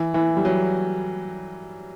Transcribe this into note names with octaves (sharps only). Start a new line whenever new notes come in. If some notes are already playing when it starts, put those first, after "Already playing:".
Already playing: E3
E3
G3
F#3